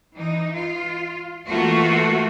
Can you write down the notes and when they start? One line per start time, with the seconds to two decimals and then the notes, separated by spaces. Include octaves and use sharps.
0.16 E3 D#4
0.53 F4
1.48 E3 A3 A#3 F4 F#4